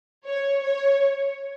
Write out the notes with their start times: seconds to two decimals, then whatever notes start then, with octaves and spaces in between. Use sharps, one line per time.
0.25 C#5
0.62 C#5